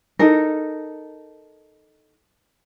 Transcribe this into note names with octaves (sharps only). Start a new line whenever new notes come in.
D#4 A4 A#4